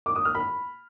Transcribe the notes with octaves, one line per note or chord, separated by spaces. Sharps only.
D6
D#6
F6
B5